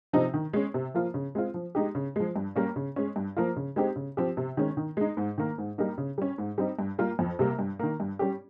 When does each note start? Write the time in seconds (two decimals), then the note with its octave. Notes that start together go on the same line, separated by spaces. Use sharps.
0.13 C3 F3 C4 D#4
0.34 D#3
0.53 G#3 C#4
0.74 C3
0.94 F3 A#3 F4
1.14 C#3
1.35 G#3 C4 F4
1.54 F3
1.75 G#3 D#4 G4
1.95 C#3
2.16 F3 G#3
2.36 G2
2.56 G3 A#3 C#4
2.76 C#3
2.96 G#3 C#4
3.16 G2
3.37 F3 A#3 F4
3.56 C#3
3.76 G#3 C4 D#4 G4
3.96 C#3
4.17 F3 C4 G4
4.37 C3
4.57 D#3 G#3 C#4
4.77 D#3
4.97 G#3 D#4
5.17 G#2
5.38 D#3 A#3
5.58 G#2
5.78 G3 A#3 D#4
5.98 C#3
6.18 G3 C#4
6.38 G#2
6.58 G3 C4 D#4
6.79 G2
6.99 G3 A#3 F4
7.19 F2
7.39 C3 G3 A#3
7.59 G2
7.79 D#3 A#3
8.00 G2
8.19 G3 C#4 G4